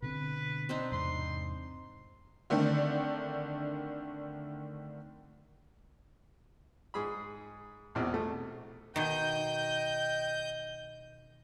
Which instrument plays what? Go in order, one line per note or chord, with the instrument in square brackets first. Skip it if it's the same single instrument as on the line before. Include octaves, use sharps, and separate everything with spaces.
[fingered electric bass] B2 D3 C4 [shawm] B4
[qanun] C4 D4 D#4
[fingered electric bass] E2 G#2 C3 [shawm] C6
[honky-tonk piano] D3 D#3 A3 C4 D4
[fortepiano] G#2 G#4 B5
A#1 E2 B2 C4
A3
[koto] B2 D#3 [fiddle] D#5 [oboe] G5 [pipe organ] G6